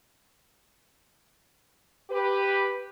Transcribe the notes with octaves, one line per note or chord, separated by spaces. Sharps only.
G4 B4